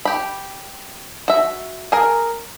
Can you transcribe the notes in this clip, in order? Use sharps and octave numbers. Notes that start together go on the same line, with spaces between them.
G4 B5
F#4 E5
G#4 A#4